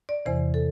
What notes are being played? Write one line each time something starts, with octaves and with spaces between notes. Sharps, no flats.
D5
E2 C3 E3 C5
A4